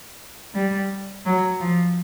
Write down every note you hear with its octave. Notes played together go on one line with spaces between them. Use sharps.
G3
F#3
F3